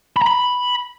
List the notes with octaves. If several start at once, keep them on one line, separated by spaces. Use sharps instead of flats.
B5
A#5
B5